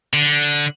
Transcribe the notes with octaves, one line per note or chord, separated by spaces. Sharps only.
D3